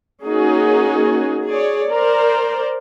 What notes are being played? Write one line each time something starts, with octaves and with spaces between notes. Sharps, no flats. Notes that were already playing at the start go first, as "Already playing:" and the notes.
A#3 C#4 D#4 F#4 G#4
G#4 C#5 D5
A#4 C5 D5